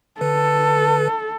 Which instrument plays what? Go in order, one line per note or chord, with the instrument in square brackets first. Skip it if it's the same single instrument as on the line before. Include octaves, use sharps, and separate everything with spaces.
[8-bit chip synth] D3 B4 [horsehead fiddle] A4